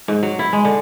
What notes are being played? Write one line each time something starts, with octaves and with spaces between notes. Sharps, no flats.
G#2
F#3
E4
G#3
D3